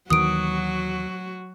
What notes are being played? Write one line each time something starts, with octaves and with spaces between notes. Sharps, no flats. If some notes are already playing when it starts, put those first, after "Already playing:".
D#2 D#3 E3 F#3 F#4 D#6 D7